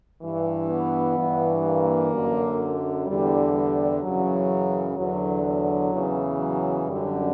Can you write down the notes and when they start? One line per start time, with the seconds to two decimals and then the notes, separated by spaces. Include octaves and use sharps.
0.22 G2 E3
0.69 B3
1.16 G2 E3
1.64 A#3
2.12 F#2 D3
3.07 E2 D3 G3
3.54 G3
4.02 F#2 C#3 E3 F#3
4.97 E2 D3 F#3
5.44 F#3
5.92 E2 C#3 E3
6.39 F#3
6.87 F#2 D3 G3